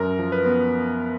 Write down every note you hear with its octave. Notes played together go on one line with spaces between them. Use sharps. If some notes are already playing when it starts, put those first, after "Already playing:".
Already playing: F#2 A#4
F3
B4
B3